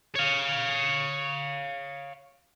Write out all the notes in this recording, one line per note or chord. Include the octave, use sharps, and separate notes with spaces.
C#5 F5